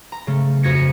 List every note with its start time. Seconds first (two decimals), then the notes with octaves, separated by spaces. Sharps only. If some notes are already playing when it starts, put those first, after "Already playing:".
0.12 A#5
0.27 C#3 A3
0.63 F2 F#4 G#6 A#6 C#7